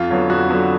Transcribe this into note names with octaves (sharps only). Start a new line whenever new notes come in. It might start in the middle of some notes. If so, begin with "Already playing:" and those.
Already playing: F2 F4
D3 F#3 B3
F2 F#4
D3 F#3 B3